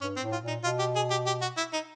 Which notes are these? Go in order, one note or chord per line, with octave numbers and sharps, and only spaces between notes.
G2 C#4
C4
A2
F4
A#2 D#4
B2 F4
G4
G#4
G4
G4
F#4
E4
D#4